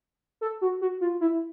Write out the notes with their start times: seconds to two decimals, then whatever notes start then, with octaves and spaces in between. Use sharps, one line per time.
0.41 A4
0.61 F#4
0.81 F#4
1.01 F4
1.21 E4